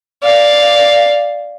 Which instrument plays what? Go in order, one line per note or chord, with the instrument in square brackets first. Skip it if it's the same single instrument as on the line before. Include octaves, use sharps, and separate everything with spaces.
[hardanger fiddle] D5 F5